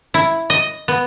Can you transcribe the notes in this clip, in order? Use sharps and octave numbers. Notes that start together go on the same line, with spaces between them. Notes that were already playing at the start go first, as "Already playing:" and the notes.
E4
D#5
B3